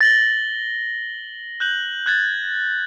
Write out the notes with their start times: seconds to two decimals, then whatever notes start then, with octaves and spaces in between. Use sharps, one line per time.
0.01 A6 A#6 F#7 G7
1.60 F#6 G6 F#7
2.06 F#6 G#6 A6